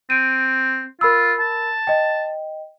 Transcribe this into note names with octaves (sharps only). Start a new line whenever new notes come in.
C4 D7 D#7
F4 A#4 B5 E6
A5
D#5 G5